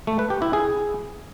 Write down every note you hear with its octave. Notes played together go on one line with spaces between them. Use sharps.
A3
B4
G4
E4
G#4